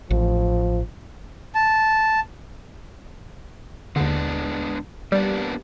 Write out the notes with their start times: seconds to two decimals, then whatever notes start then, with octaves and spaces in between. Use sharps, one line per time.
0.11 A1 F3
1.55 A5
3.96 D#2 D3 G#3 B3 D4
5.12 G3 A#3 B3 D4